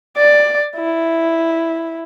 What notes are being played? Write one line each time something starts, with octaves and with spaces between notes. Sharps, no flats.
D5
E4